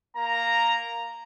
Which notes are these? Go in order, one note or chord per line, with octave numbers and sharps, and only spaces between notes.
A#3 A#5